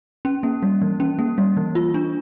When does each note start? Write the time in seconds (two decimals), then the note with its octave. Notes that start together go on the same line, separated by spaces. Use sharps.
0.25 C#4
0.43 A#3
0.63 G3
0.82 E3
1.00 C#4
1.19 A#3
1.38 G3
1.57 E3
1.75 F4
1.94 D4